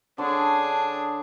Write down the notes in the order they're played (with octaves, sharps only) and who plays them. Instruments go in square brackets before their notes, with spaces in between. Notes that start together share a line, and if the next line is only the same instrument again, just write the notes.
[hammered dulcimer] D3 C#5 [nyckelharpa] D4 G#4